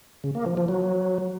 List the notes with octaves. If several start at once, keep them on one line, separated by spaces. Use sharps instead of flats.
C#3
A#3
F3
F3
F#3